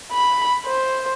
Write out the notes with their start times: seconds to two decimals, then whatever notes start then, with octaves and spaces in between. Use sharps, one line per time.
0.12 B5
0.65 C5